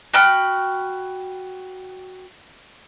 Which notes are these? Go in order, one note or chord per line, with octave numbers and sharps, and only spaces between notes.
F#4 G5 B5 F6